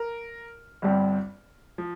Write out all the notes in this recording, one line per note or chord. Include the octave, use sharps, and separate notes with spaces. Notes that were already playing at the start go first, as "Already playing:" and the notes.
Already playing: A#4
G1 G2 G3 C4
F3